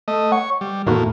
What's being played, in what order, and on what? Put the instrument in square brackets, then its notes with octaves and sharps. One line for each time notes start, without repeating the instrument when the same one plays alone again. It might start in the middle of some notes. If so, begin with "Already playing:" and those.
[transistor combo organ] A3 D#5
[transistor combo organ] C#5 C#6 [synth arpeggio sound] F#5
[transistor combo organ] G3
[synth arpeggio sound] E2 D#3 F#4 [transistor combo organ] A2 A#3